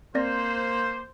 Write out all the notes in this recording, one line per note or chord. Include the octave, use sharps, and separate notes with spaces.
A#3 C4 C5 D5 A#6